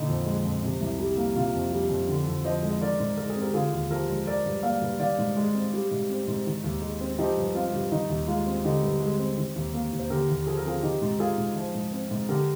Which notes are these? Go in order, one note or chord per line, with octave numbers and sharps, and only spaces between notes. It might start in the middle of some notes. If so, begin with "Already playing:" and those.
Already playing: A#2 D3 D#4
F2
G#3
F2
C3
C2
G3
A#3
C3 F4
F2
G3
F2
D3
F2
F3 C5 D#5
G#3
D#5
D#3 A#4 D5
G#2
G#3 A#4
G#4
C4
G4 A#4
D3 F4 G#4
D#2
F3 G4 A#4
G#3
F3 A#4 D5
G2
A#3 D5 F5
G2
D#3 D5 F5
G#2
G#3
C4
G3
G#2
C4
G#2
D#3
D#2
G#3
C4
F3 D#4 G4
G2
C4 F4
G2
D#3 D#4
D#2
G#3 F4
C4
D3 D#4 G4
G2
G#3
C4
D#3
D#2
A#3
D#2
C5
D3 G4 A#4
D#2
F3 G#4
A#4
C4 F4 G#4
D#3 D#4 G4
G#2
G#3 F4 G#4
G#2
F3
G#2
C4
G#2
D3 G4 A#4